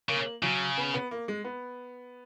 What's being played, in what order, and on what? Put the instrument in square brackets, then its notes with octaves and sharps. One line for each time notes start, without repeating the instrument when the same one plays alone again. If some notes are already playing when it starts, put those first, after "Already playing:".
[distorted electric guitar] C#3 [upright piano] A#3
[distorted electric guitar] C#3 [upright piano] F#3
[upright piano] B3
B3
A#3
G#3
B3